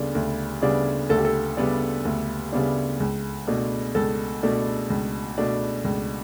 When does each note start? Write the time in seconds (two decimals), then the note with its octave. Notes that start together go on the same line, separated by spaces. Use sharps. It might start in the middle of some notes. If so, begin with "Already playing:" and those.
Already playing: D2 C#3 G3 B3 D4
0.15 D2
0.62 C#3 G3 B3 D4
1.09 D2 A4
1.18 G4
1.25 A4
1.57 C#3 G3 B3 D4
2.05 D2
2.52 C#3 G3 B3 D4
3.00 C#2
3.47 B2 A3 D4
3.95 C#2 A4
4.43 B2 A3 D4
4.90 C#2
5.38 B2 A3 D4
5.84 C#2